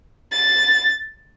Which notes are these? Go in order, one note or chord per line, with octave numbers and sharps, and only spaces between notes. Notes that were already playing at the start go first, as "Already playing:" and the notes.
A6